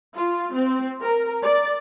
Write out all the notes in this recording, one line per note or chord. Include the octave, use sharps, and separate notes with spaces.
F4
C4
A#4
D5